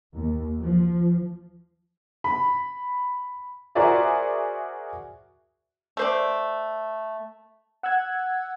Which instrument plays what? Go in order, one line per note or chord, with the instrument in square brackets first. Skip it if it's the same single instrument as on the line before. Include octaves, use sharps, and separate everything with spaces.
[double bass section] D#2
F3
[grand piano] B5
[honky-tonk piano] F#4 G#4 A#4 C5 D5 E5
[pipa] A3 C5 D5
[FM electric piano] F#5 E6 F#6 G#6